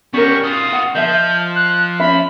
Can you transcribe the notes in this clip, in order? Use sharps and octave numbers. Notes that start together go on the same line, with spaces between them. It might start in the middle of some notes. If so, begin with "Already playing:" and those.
G3 B3 C#4 A#4 C#6
F4 F#4 D#6
F#5
F3 D#5 E5 A5 G6
F#6
C#4 E5 B5